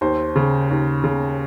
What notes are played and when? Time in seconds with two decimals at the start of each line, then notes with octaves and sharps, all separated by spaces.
0.01 D#2 C5
0.36 C#3
0.70 D#2
1.04 C#3